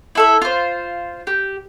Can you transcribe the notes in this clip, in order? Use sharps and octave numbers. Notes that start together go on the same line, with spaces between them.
E4 A4 E5
F4 C5
G4